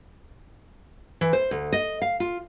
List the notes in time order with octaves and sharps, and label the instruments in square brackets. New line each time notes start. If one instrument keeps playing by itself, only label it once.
[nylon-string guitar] E3
C5
D2
D#5
F5
F4